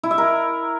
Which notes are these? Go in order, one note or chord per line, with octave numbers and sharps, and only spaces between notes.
E4
E5
A#4